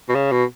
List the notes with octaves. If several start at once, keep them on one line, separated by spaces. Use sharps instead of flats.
B2
C#3
B2